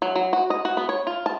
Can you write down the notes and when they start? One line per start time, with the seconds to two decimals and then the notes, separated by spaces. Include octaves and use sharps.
0.02 F#3
0.16 F#3
0.33 F#4
0.50 D#5
0.65 F#4
0.77 B3
0.89 C#5
1.07 F4
1.26 A5